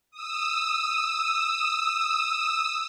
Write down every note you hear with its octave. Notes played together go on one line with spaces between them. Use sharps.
D#6 E6